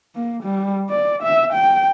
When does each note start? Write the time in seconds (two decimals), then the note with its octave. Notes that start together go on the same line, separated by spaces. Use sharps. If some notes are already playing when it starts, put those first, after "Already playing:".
0.15 A#3
0.43 G3
0.90 D5
1.23 E5
1.53 G5